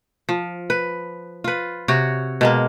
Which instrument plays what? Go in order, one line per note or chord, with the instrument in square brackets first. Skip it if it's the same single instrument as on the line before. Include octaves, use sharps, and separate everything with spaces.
[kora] F3
B4
F4 B4
C3 F#4 C#5
B2 G#3 A#3